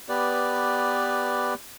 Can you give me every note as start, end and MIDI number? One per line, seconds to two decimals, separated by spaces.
0.09 1.54 59
0.09 1.54 67
0.09 1.54 71
0.09 1.54 74